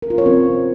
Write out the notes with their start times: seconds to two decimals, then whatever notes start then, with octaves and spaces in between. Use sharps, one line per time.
0.02 A#4
0.10 F4
0.18 C#5
0.26 C4